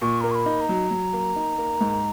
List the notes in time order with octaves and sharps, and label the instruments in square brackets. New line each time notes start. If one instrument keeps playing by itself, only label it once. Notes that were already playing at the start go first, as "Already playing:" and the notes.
[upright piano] A#2 [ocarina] C#6
[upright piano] A#3 [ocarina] A#5
[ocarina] C#6
B5
[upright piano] D#4
[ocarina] A#5
[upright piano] F#3
F#3
A#3
D#4
A#3
G#2